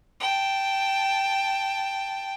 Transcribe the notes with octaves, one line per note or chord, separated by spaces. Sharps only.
G5 A5